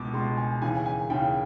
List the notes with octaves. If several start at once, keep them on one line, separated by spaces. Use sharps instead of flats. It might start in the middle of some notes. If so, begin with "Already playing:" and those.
Already playing: C#2 B2 D6
C#2 B2 C6
G#5
D#2 C#3 E3 G#5
G#5
D#2 C#3 E3 G5